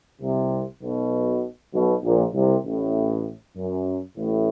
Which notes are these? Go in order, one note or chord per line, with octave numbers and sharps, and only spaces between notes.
C2 C3
B1 B2
B1 B2
A#1 A#2
C2 C3
A1 A2
F#2
A1 A2